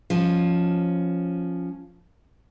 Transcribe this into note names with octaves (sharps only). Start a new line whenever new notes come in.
F3 C#4